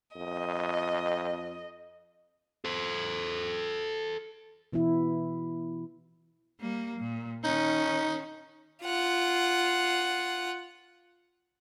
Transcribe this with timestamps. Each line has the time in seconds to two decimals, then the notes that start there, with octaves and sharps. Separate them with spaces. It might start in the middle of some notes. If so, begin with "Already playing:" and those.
0.16 F2 D#5
2.65 A4 C5
4.73 B2 E3 B3 E4
6.60 G3 A#3
6.98 A#2
7.44 D#3 C#4 D#4
8.83 F4 F#5